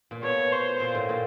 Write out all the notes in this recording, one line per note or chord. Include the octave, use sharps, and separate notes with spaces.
A#2
B2 C#5
C5
A#2
A2
A#2